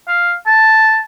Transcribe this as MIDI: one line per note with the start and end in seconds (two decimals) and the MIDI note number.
0.08 0.33 77
0.46 1.01 81